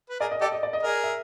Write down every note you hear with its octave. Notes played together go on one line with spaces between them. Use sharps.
B4
G#4 A#4 D5
D#5
G4 A4 D5
D#5
D5
D#5
G#4 A#4 D5
E5